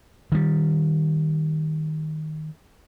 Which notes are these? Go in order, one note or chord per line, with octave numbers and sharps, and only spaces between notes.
D#3 G3